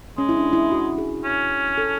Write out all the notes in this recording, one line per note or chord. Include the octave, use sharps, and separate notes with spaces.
G#3 C#4
E4
D4
E4
F#4
G#4
C#4
A4